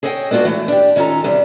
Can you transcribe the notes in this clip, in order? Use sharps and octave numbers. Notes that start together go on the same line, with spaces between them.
G#4 A4 C#5 D#5 F#5 G5
G#3 B3 D4 F4 F#4
E3 A3
D4 G4
D#3 C#4 F4 A4 A#5
E2 C3 G3 D4